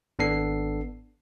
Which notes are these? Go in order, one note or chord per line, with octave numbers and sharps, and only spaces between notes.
G#1 B3 D4 A4 C7